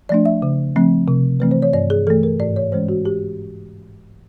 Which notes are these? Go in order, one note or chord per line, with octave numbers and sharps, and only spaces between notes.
F3 A3 D4 D5
E5
C#3
F3 A3 C4
C3
E3 A3 C4 B4
C5
C#5
G2 D5
G#4
E3 A3 A4
A#4
G#2 D5
C#5
E3 G#3 C#4 C5
F#4
G4